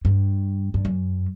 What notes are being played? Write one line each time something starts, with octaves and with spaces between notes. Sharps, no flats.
G2
G2
F#2